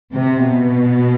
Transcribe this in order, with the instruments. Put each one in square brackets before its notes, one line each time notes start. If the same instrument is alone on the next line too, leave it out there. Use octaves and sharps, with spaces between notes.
[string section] C3
B2